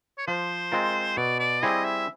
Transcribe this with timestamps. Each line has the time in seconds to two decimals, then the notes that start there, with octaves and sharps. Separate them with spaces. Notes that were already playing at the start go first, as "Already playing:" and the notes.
0.18 C#5
0.27 F3 C5
0.72 G#3 C4 F4 A#4
1.17 B2 D5
1.39 D5
1.63 G3 C4 E4 G#4 D#5
1.85 E5